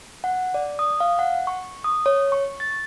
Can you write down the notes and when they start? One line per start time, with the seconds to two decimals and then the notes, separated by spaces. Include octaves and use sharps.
0.24 F#5
0.54 D5
0.79 D#6
1.00 F5
1.19 F#5
1.47 C#6
1.84 D#6
2.06 C#5
2.32 C#6
2.60 A6